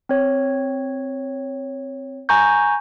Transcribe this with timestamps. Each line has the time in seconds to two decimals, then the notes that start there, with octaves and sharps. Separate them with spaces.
0.09 C4 C#5
2.29 G#5 A#5 C#6 G6